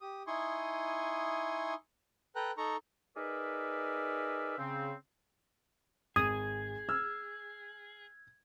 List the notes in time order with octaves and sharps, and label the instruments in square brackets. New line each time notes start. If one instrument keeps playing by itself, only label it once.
[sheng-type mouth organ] G4 D#6
D#4 E4 G#5 C6 C#6 D#6
A4 B4 G5 A#5 F#6
D#4 A4 A#5 C#6
[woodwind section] D#4 G#4 A#4 B4 D5 E5
C#3 C4
[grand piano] G#1 D#7 [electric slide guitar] G#4 [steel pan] D#6 [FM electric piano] G#6
[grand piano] E6 F6